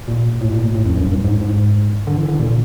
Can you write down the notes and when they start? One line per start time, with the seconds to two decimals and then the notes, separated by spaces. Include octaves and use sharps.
0.08 A#2
0.41 A2
0.52 A#2
0.63 A2
0.75 A2
0.86 F2
0.97 F#2
1.07 G2
1.25 G#2
1.41 G#2
2.07 D3
2.17 E3
2.28 D3
2.39 A#2